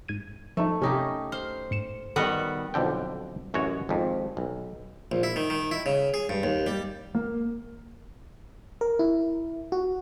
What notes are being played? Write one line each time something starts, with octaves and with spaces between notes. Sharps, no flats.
G#2 G#6 D#7
F3 A3 D#4
C3 C#4 D#4 G4
C5 F6
G#2 C#7 E7
D#3 G3 B3 F#4 A4 D#5
B1 F2 D3 G5
A1 F#2 F#4 C#5
G#1 F2
B1
A#1
E4
D#3
D#3
E4
C#3
G#4
G2
D#2
G3
A#3
A#4
E4
F#4